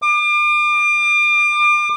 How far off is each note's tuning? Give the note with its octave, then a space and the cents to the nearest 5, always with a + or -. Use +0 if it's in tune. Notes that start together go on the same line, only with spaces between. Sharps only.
D6 +35